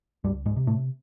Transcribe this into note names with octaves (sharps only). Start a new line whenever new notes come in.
C#2 G2 G3
G#2 G#3
C3
A2 A3